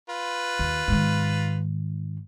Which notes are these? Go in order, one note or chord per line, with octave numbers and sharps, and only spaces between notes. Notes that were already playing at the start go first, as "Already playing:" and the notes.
F4 B4
D#2
G#2 D#3